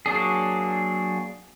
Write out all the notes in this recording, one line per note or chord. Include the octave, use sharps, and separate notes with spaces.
F#3 A#3 D4 G#4